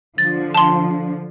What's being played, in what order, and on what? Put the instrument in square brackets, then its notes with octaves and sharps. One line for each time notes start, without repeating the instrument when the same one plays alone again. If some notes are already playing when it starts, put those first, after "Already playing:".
[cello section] D3 F3 [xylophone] A6
[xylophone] A5 C6